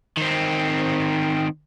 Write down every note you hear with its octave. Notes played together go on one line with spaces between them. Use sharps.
D#3 C4